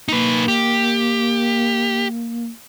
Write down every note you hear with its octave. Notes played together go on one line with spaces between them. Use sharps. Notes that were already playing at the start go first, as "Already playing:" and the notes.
A#3 D#4 B4
G4